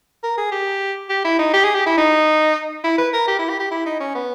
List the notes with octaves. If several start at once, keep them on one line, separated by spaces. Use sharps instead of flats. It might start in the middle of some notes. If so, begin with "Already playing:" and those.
A#4
G#4
G4
G4
E4
D#4
G4
G#4
G4
E4
D#4
E4
B4
A#4
G4
E4
G4
G4
E4
D#4
C#4
B3